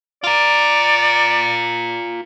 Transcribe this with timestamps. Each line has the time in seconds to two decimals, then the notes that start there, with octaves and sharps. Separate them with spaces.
0.24 F4 A#4 D5